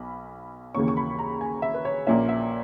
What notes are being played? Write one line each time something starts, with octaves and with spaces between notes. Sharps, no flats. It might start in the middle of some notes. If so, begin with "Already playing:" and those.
Already playing: B1 B5
D#2 C#3 E3 A#3 C#4 C#6
C#6
B5
A#5
G#5
E5
B4
C#5
A#1 A#2 A#3 C#4 E5
E5